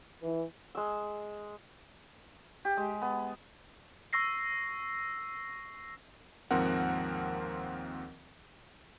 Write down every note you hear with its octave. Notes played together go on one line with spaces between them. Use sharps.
E3
G#3 E6
G4
G#3
B3
C#6 E6 A#6 C7
D#2 G#2 F3 C4 A#4 F#5